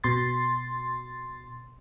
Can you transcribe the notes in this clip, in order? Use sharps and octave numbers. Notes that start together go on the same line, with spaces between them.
B2 C6 A6